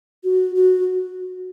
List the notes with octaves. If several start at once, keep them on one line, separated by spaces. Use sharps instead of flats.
F#4
F#4